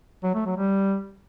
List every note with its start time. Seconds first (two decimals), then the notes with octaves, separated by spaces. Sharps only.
0.23 F#3
0.35 A3
0.46 F#3
0.57 G3